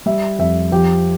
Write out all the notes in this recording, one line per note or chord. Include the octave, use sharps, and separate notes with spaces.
G3 E5
F2 E5
F3 G4